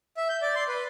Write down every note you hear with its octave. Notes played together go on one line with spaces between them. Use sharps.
E5
G6
D5
C6
B4